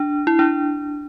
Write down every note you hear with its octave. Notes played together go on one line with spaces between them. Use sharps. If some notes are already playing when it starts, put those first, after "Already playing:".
Already playing: D4
E4
D4